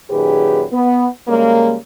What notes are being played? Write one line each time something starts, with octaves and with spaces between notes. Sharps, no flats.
F#2 A#2 D#3 G4 G#4 B4
B3
C#3 G3 G#3 A#3